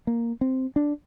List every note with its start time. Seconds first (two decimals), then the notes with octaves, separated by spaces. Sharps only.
0.07 A#3
0.41 C4
0.76 D4